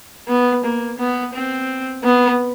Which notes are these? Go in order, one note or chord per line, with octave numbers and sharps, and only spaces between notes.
B3
A#3
B3
C4
B3